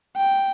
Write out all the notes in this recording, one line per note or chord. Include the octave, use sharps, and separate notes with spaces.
G5